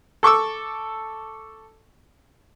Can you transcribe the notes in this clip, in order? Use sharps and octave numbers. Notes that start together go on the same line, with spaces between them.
A4 C#6 D6 E6